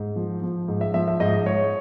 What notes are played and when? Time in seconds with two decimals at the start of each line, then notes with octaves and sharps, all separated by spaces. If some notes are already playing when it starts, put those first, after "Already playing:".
Already playing: G#2
0.16 F3
0.42 F3
0.68 G#2
0.81 E5
0.94 F3 E5
1.08 E5
1.20 G#2 D#5
1.46 G#2 C#5